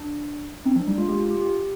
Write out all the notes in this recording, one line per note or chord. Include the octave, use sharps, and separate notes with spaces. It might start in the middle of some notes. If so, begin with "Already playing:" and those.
Already playing: D4
C4 D#4
F3 D4
G3 D#4
G#3 F4
G#3 G4
F4
G4
G4